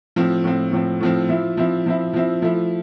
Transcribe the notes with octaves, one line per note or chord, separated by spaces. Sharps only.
A2 F3 C4
A2 F3 C4
A2 F3 C4
A2 F3 C4
F3 C4 E4
F3 C4 E4
F3 C4 E4
F3 C4 E4
F3 A3 E4